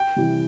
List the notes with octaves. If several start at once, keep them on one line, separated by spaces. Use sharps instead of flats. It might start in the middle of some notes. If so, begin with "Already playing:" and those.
Already playing: G5
C3 E3 G3